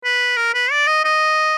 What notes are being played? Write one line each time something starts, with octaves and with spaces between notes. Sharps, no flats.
B4
A#4
B4
D5
D#5
D#5